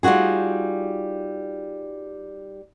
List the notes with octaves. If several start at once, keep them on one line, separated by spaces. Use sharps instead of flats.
G3 D#4 F4 F#4 G#4